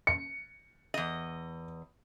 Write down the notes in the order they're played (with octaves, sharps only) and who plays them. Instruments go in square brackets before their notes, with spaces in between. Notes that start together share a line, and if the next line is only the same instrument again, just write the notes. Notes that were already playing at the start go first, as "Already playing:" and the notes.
[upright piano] C#7
[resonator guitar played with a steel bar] E2 D#5